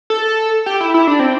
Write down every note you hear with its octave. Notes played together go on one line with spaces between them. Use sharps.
A4
G4
E4
E4
D4
C4